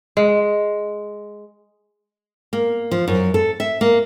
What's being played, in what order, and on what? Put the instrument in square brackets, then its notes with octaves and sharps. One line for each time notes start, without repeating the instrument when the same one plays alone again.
[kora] G#3
[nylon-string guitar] A#3
F3
F#2
A4
E5
A#3